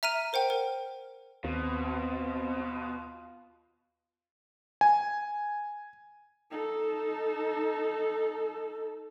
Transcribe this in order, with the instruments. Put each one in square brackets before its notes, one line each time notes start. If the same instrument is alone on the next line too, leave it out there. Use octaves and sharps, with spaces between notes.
[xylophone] E5 A#5 F6 D#7
A#4 C5 F#5 G5
A#4
[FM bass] D#2 [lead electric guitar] B2 [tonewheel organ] C4 [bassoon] F4
[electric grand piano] G#5
[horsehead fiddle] D#4 A4